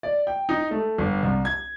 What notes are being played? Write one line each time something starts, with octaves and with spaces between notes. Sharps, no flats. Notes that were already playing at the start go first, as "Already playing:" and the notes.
D5
G5
D#4
A3
G1
C2
G#6